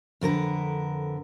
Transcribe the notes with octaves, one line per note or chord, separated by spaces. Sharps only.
F2 D3 A#4 B4